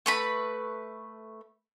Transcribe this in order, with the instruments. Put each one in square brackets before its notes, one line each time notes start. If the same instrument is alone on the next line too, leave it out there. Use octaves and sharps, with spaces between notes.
[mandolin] A3 B4 B5